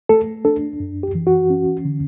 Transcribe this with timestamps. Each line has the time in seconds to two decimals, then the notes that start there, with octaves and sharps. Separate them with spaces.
0.09 A3 A4
0.45 D4 A4
0.80 F#2
1.03 G4
1.15 E3
1.27 F#4
1.50 C#4
1.85 D3